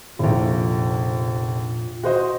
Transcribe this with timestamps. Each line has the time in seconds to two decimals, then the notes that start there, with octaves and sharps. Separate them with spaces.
0.19 F1 A#1 A#2
2.03 F#4 C5 D#5